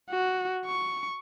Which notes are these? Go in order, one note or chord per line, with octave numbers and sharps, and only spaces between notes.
F#4
C#6